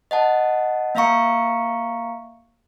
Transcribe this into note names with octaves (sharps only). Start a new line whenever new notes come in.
D#5 F#5 A5
A#3 E5 F5 A#5 C#6 C#7